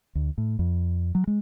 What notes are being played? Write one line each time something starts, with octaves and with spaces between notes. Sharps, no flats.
D2
A2
F2
F#3
G#3